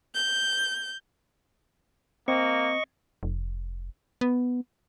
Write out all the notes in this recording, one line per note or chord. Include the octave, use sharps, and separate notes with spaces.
G6
A#3 C4 D#5 C#6
F1
B3